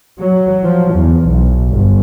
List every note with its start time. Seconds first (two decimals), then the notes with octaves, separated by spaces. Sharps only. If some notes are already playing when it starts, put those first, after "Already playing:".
0.19 F#3
0.65 F3
0.95 E2
1.28 B1
1.72 G1